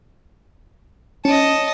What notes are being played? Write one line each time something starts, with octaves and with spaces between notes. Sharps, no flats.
C#4 D#5 A5